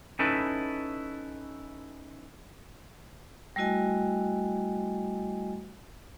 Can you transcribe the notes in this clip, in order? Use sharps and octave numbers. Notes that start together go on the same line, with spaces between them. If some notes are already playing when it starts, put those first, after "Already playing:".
C#4 D#4 E4 A4 B4
G3 A3 E4 F#4 D#5 G#5